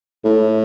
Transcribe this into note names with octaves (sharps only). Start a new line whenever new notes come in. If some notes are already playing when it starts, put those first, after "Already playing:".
A2